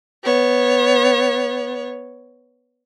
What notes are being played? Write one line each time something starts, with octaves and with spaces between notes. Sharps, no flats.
B3 C#5